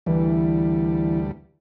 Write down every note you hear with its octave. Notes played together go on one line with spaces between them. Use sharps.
D2 E3 G3